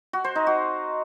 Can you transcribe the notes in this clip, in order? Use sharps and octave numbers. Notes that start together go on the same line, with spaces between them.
F#4
C5
D#4
F#4